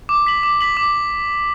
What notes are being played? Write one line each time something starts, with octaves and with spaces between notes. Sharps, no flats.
D6
B6 F#7
D6
B6 F#7
D6